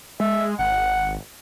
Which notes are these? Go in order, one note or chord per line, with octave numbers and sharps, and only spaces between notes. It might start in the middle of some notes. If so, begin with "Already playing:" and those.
G#3 E5
G#1 F#5